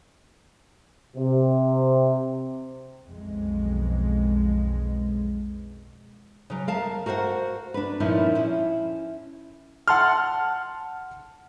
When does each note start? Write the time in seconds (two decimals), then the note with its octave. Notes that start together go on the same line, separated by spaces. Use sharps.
1.16 C3
3.09 B1 F2 B2 G#3
6.50 C#3 F#3
6.68 A#4 F5 A5
7.06 F#4 A#4 C5 F5 F#5
7.74 D4 B4
8.00 A#2 F3 C#4 D#4 E4
8.35 C#4 E4
9.88 F#5 A5 C6 F6